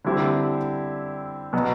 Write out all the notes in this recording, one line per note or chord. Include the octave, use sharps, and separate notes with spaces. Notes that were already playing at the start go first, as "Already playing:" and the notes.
D3 G3 C4 E4 G4
B2 F#3 B3